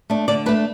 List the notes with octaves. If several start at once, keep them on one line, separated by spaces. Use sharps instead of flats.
A3 D4
D3 D5
A3 D4 B4